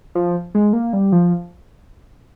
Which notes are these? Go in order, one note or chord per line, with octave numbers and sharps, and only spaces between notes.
F3
G#3
A#3
G3
F3